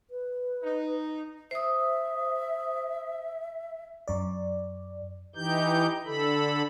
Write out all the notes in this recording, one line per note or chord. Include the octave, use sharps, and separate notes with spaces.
B4
D#4
C5 E5 D#6
F#2 D5
E3 D#4 G4 G6
D3 A4 B5